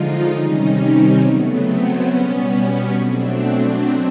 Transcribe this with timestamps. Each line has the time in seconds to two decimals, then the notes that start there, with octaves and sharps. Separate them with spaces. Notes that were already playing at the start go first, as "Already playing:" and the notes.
Already playing: D3 F3 G#3 D#4 F4
0.29 C3 D#3 G3 C#4 D#4
0.74 C4
1.18 C#3 F#3 A3 B3
1.48 C4
1.77 B3 C#4
2.06 B2 G3
2.93 B2 F#3 A3 C4 D4